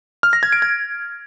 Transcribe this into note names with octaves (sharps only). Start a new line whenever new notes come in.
F6
A#6
G#6
D7
G#6